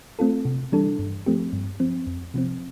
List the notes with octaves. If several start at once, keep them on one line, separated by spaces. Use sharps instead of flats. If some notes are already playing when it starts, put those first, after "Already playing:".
A3 C4 F4 A4
C3
E3 G3 D4 A4
G2
F3 A3 C4 G4
G2
F3 C4
F2
C3 F3 C4